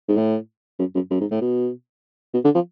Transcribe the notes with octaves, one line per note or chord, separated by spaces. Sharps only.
G#2
A2
F#2
F#2
F#2
G#2
A2
B2
B2
D3
F3